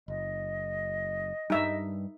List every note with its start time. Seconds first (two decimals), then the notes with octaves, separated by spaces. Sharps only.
0.08 F#1 D#5
1.50 G2 G3 D#4 E5